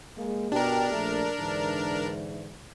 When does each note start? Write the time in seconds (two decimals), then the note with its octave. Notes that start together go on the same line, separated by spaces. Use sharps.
0.17 G#3 A#3
0.52 B2 D4 G4 A#4
0.91 A#1 A3
1.38 G#2 D3 E3